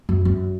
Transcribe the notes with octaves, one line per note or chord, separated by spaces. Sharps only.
F#2
F#2